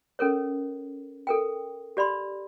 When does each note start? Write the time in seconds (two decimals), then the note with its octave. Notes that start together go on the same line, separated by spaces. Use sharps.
0.19 C#4 A4 A#4 C#5
1.27 A4 A#4 G5
1.97 G4 D5 B5 C6